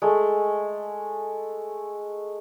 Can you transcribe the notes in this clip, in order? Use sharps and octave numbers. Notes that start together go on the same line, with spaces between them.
G#3 A3